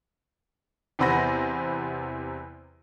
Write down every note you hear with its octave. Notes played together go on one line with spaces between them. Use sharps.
E2 C3 B3 C5 B5 A#6